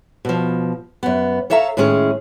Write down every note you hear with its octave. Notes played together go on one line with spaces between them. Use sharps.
B2 F3
F#2 B3
A4 C#5 E5 F5 G#5 A#5
A2 D#3 G#3 C#4 G#4